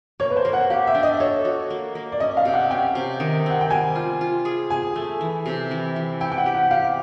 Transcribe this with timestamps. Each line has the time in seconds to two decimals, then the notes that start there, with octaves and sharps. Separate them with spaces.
0.20 A#3 C#5
0.30 B4
0.37 C5
0.45 A#3
0.53 F#5
0.70 G4 F5
0.87 E5
0.95 D4
1.03 D#5
1.20 A4 C#5
1.45 F#4
1.70 A#3
1.95 A#3
2.12 D5
2.20 C#4 D#5
2.37 F5
2.45 C3
2.54 F#5
2.70 C#4 G5
2.95 C3
3.20 D#3
3.46 C4 F#5
3.61 G5
3.70 G3 G#5
3.95 F4
4.21 F4
4.45 G#4
4.70 G#4 G#5
4.96 A3
5.21 E3
5.46 C3
5.71 E3
5.96 E3
6.21 E4 G5
6.32 G5
6.37 F#5
6.46 G4
6.54 F#5
6.71 G4 F5